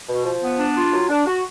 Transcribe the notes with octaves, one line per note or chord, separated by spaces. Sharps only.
B2
F3
B3
D4
F4
F#3
D4
F#4